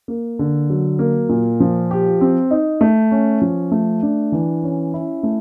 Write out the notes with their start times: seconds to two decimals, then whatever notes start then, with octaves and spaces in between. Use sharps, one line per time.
0.08 A#3
0.39 D3
0.70 F#3
0.99 A#3
1.29 A#2
1.60 F3
1.91 G4
2.21 C4
2.51 D#4
2.81 A3
3.11 C#4
3.42 F3
3.72 A3
4.02 D4
4.32 E3
4.63 C#4
4.94 E4
5.23 A3